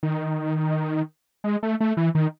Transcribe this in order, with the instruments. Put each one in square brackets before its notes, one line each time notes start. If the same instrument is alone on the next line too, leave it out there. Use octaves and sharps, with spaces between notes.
[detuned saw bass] D#3
G#3
A3
A3
E3
D#3